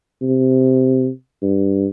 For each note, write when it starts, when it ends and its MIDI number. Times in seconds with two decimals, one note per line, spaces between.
0.22 1.09 48
1.42 1.87 43